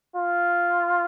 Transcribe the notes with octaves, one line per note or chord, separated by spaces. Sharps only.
F4